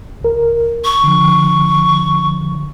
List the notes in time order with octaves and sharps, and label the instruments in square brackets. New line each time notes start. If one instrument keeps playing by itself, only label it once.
[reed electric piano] C#2 A#4
[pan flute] C#6
[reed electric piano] D3 F3